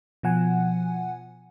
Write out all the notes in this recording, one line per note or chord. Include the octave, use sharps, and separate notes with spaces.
B2 F3 F#5 G#5